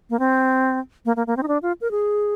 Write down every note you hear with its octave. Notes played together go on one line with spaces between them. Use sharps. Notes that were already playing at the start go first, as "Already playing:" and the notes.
A#3
C4
A#3
A#3
A#3
C4
D#4
D4
F4
A#4
G#4